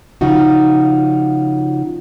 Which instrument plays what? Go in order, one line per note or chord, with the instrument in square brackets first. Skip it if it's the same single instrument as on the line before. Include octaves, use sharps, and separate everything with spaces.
[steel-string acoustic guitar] C#3 F3 D#4 F4 F#4